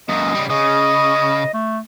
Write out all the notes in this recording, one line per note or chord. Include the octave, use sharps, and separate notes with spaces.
F#2 A#2 D#5
C#3 G3
C#3 D#5 D#6
A3